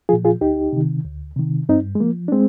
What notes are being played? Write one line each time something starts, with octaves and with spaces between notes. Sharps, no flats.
A#2 F3 F4 G#4
F4 G#4
D2 D#4 G4
C3 D#3
D2
C3 D#3
G2 C4 D#4
G#3
F3 A#3
D4
G#3 C4